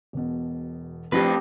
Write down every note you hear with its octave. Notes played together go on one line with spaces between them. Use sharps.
E1 B2
A2 F3 C4 D4 G4 B4 A#6